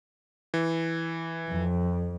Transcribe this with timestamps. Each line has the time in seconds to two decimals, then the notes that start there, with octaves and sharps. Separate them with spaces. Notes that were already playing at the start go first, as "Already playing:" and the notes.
0.54 E3
1.53 F2